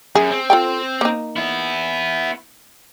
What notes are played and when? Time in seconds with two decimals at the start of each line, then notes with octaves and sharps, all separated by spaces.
0.15 F#2 G#4
0.31 C4
0.50 F4 A4 G5
1.01 A#3 D#4
1.36 B3 E4